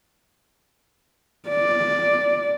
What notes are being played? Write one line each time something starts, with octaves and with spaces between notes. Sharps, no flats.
D5